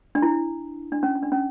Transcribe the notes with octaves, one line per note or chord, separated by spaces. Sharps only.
D4
E4
D4
C#4
C#4
D4
C#4